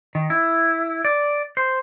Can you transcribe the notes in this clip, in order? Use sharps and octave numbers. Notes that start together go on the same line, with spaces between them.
D#3
E4
D5
C5